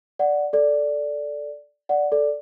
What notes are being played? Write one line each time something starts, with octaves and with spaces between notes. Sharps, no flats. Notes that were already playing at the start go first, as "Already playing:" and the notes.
D5 F#5
A4 D5
D5 F#5
A4 D5